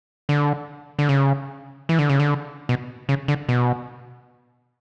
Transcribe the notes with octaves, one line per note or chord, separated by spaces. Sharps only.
D3
D3
C#3
E3
D3
C#3
D3
B2
C#3
D3
B2